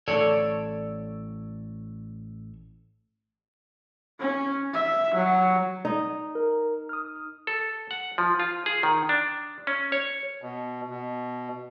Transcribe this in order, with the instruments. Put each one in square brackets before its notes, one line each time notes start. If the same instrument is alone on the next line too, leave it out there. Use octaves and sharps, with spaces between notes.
[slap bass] A1 [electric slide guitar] A4 C#5 D5
[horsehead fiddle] C#4
E5
F#3
[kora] D#4
[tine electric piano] A#4
D#6 F6
[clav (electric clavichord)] A4
F#5
F3
F4
G#4
D#3
D4
C#4
C#5
[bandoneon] B2
B2